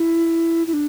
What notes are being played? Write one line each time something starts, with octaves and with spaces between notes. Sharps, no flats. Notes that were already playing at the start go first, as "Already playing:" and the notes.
Already playing: E4
E4
D4